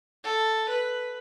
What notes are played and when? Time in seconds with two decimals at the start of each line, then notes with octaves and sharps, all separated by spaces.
0.24 A4
0.69 B4